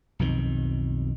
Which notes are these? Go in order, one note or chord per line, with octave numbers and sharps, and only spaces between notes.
B1 F2 D#3